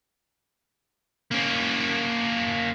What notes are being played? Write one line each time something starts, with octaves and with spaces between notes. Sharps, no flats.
A#3 C#4